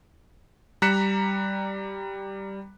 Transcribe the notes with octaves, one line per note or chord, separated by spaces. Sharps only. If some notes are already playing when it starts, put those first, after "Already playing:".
G3 A#5 F#6 B6 C#7 E7